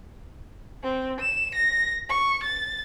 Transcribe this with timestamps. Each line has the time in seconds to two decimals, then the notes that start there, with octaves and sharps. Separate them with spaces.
0.83 C4
1.20 E7
1.55 A#6
2.09 C#6
2.43 A6